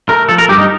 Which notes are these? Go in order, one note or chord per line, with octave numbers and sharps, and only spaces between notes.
A3 A#4
F3 A4
A#4
G2 G4
D#4